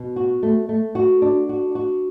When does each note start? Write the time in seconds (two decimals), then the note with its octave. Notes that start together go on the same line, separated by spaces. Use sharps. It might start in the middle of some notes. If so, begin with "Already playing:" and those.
Already playing: B2
0.16 F#4
0.43 A3
0.69 A3
0.95 F#4
1.22 D4
1.49 F#4
1.75 F#4